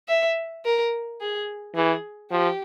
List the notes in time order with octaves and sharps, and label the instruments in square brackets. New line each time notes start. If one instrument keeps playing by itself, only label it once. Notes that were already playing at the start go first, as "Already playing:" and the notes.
[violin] E5
A#4
G#4
[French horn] E3 [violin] G#4
[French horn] F3 [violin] G4